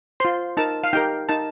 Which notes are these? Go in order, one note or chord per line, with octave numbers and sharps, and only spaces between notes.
F4 C5 C6
D#4 A#4 A5
F5
D#4 G4 A#4 G5
D#4 A#4 A5